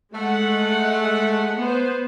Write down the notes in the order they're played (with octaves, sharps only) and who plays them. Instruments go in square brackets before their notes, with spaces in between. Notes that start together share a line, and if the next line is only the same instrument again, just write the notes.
[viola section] G#3 F#5 [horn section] A3
[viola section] B3 C5